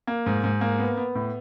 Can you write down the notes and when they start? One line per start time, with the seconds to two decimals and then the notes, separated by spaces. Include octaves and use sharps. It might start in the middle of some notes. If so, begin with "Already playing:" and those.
0.07 A#3
0.26 G#2
0.44 G#2
0.61 A#3
0.79 B3
0.97 B3
1.15 A2